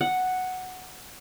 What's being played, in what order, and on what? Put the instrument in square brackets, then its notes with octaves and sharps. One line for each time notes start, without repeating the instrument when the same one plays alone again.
[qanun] F#5